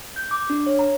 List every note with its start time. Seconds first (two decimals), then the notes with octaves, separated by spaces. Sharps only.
0.16 G6
0.31 D6
0.50 D4
0.66 C#5
0.79 A#5